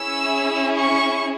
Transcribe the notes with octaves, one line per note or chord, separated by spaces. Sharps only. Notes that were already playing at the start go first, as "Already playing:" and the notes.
Already playing: C#4 E4 G#4 E6
C#6